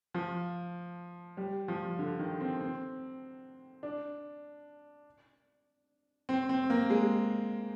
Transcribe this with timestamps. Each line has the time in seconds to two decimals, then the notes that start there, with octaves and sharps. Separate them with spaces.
0.14 F3
1.37 G3
1.68 F3
1.99 D3
2.19 D#3
2.40 C4
2.60 C4
3.83 D4
6.29 C4
6.49 C4
6.70 A#3
6.90 G#3